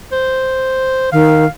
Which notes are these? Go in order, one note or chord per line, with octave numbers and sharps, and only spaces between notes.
C5
D#3 F5